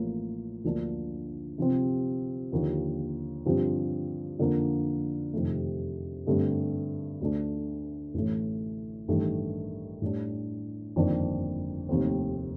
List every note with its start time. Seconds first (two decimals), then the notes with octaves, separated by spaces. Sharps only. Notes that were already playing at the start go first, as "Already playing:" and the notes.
Already playing: A1 A2 F3 A#3
0.64 D2 D3 F3 A#3 D4
1.58 C3 F3 C4
2.52 D#2 D3 F3 A#3
3.46 G2 D3 F3 C4 G4
4.39 F2 D3 F3 A#3 D4
5.33 F2 C3 D#3 A3
6.26 G2 D3 A3 C4 G4
7.21 D2 D3 A3 D4
8.14 A1 A2 A3
9.08 A1 G2 D#3 A3
10.02 A2 G3 D4
10.96 G1 F2 D#3 A#3 D4
11.89 F1 D#2 D#3 A3 C4